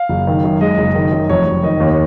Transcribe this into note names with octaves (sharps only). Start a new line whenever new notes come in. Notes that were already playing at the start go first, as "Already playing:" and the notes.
Already playing: F5
F#1
D#3
F#2
G#3 D#5
F#1
D#3
F#2
F1 C#5
F1
D#3 D#5
D#2